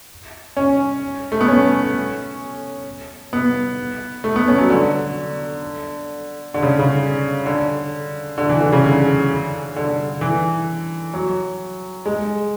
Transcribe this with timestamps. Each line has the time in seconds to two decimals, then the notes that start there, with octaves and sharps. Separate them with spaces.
0.57 C#4
1.32 A3
1.41 B3
1.48 C#4
3.33 B3
4.24 A3
4.36 B3
4.48 C#4
4.58 F#3
4.70 D3
6.54 D3
6.62 C#3
6.79 C#3
7.46 D3
8.38 D3
8.49 E3
8.61 D3
8.72 C#3
8.84 D3
9.76 D3
10.21 E3
11.14 F#3
12.06 G#3